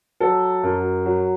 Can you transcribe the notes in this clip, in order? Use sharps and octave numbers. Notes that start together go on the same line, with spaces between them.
F#3 A4
F#2
F#3